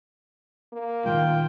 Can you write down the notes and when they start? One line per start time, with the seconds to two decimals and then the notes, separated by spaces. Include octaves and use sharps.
0.73 A#3
1.06 A#2 D#3 G#3 F4 G5